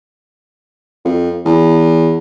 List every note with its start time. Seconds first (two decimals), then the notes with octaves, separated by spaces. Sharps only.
1.05 F2
1.45 E2